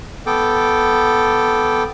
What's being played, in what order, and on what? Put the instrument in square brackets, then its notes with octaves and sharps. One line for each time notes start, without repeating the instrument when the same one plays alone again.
[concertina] B3 A4 G5 D6